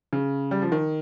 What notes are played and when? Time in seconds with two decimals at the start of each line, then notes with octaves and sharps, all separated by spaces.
0.13 C#3
0.51 G3
0.62 F3
0.72 D#3